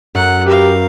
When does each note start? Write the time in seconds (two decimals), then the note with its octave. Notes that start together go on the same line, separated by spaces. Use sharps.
0.15 F#2 F#5
0.46 G4 A#4 B4 F5